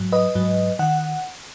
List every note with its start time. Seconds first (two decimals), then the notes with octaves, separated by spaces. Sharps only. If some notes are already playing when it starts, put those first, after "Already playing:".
Already playing: G#2 F#3
0.12 B4 D#5
0.35 G#2 F#3
0.79 D#3 F#5